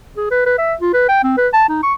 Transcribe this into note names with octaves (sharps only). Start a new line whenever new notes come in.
G#4
B4
B4
E5
F4
B4
G5
C4
B4
A5
D#4
C#6